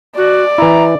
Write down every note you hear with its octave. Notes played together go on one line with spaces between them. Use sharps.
F#4 D5
E3 E4 A#5